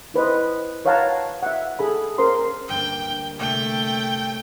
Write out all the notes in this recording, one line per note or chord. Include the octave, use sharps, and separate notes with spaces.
E4 B4 C5 D#5
B4 C#5 F5 F#5 A5 A#5
E5 F#5
G#4 A4 B5
C#4 A#4 C5 C6
D2 G2 A#3 G5
C3 A3 G5
C#5